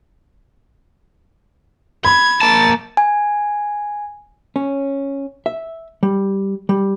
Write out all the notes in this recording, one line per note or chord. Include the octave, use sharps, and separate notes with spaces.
B5 G#6
A#3 A5 A6
G#5
C#4
E5
G3
G3